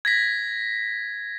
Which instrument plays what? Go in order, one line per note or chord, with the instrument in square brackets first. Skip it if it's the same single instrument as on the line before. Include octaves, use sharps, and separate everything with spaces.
[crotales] G#6 A#6 B6